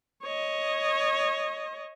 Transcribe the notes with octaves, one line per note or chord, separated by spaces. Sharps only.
C#5 D#5